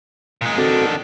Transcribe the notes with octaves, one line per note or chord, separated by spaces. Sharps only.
A#2 G#3
D#3 C4 D4 F#4 A4